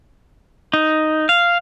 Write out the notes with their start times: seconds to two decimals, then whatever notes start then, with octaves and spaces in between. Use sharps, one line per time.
0.73 D#4
1.29 F5